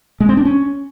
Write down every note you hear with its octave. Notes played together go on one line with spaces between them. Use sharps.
G#3
C4
D4
C#4